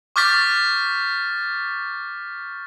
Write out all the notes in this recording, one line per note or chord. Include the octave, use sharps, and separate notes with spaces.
C#6 D6 F6 G6 A6 B6